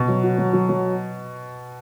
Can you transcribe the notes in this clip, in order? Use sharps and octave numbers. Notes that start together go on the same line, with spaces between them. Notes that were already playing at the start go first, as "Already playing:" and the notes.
Already playing: B2
F#3
F#4
F#3
F#3
F#3